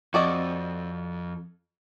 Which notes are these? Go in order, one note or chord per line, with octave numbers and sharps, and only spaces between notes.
F2 F#4 D5 D#5